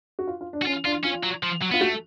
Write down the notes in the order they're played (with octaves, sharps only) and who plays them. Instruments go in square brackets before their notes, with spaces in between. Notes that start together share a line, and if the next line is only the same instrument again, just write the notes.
[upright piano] F#4
F4
F4
D4
[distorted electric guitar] F#4
[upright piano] C#4 [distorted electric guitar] F4
[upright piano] D4 [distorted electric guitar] F4
[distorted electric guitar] C#4 [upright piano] F4
[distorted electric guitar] F#3
F3
F#3
[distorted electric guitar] B3 [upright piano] F4
[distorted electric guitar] A3 [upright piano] F#4